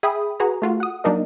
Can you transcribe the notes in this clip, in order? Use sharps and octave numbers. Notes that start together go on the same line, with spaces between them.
G#4 E5 G5 B5 D#6
F#4 G#4 B4 A#5
A3 F4 F#4
F#5 D#6
F#3 A#3 D4 D#4 A#4 D#5